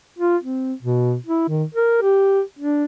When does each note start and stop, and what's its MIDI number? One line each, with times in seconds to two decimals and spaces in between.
0.19 0.37 65
0.43 0.74 60
0.83 1.16 47
1.26 1.45 64
1.48 1.64 51
1.75 2.01 70
2.02 2.41 67
2.59 2.85 62